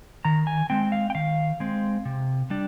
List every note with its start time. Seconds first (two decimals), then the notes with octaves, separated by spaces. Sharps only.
0.25 D#3 A#5
0.47 G#5
0.70 G#3 C4 G5
0.92 F5
1.10 G5
1.15 D#3 F5
1.60 G#3 C4
2.05 C3
2.50 G3 D4